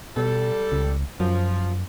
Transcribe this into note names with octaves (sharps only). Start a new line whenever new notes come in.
B2 G3 A4
C#2
F#2 F3